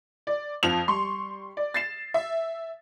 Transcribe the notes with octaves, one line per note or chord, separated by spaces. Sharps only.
D5
F2 F3 F7
G3 C6 C#6
D5
A6 C7 E7
E5